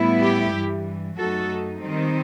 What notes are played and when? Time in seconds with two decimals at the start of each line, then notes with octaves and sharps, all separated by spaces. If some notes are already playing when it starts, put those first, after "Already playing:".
Already playing: A2 G3 B3 E4
0.21 G4
0.54 G2 E3 G3
1.17 F#2 F#3 A3 D#4 F#4 A4
1.81 D#3 G3 C4 D#4